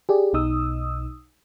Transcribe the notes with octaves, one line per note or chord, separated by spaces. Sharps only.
G4 G#4 D5
B1 B2 D#4 D#6 E6